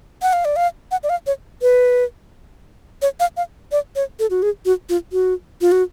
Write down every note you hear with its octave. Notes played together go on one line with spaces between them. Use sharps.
F#5
F5
D5
F5
F#5
D5
F5
C#5
B4
C#5
F5
F5
D5
C#5
A4
F#4
G#4
F#4
F4
F#4
F4
F#4